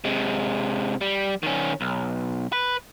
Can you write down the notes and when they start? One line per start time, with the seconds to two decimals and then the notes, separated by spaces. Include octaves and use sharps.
0.04 C3 G#3
1.01 G3
1.43 D#3 C#4
1.81 B1
2.53 B4